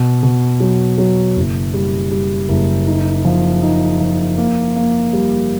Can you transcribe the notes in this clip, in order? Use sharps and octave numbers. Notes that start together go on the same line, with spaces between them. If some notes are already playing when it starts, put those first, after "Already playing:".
Already playing: B2
B2
F#3
F#3
F#1
G3
G3
F#1
D#4
F3
D#4
F3
A#3
A#3
G3